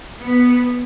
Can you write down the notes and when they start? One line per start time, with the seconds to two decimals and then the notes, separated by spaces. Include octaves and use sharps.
0.21 B3